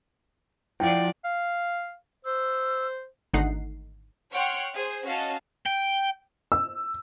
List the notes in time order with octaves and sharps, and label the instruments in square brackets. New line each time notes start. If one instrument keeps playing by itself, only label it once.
[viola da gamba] F3 D5 [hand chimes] E4 F#5 [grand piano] G5
[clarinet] F5
[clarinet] C5 [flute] E6
[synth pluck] G#1 D3 A3 D#4 F#5 C7
[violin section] C#5 F#5 G5 C6 C#6 F6
G#4 C5
C#4 F#4 D#5 F5 A5
[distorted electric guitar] G5
[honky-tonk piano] E6